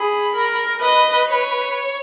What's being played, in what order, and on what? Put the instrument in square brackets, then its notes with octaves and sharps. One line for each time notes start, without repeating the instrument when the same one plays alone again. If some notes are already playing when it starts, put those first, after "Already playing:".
Already playing: [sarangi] G#4 [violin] B5
[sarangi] A#4
[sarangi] B4 [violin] D#5
[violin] C#5